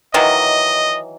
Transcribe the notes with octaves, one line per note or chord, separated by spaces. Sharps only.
D#3 E3 F#3 D#5